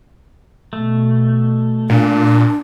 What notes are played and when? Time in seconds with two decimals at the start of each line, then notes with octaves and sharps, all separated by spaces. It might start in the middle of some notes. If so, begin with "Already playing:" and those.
0.73 B2 A3
1.90 A#2 D4